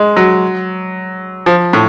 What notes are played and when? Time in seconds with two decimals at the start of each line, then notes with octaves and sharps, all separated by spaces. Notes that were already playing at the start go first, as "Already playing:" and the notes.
Already playing: G#3
0.17 F#3
1.46 F3
1.73 A2